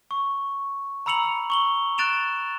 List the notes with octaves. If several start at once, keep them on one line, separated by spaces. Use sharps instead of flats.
C#6
A#5 B5 E6 C#7 F7 F#7
C#6 F#7 G7
F#6 A6 D7 E7 F7